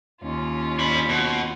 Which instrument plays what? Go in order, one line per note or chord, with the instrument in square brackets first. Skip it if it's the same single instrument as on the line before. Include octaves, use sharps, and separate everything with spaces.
[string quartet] D#2 C#4 F4
[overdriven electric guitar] D4 B5
B2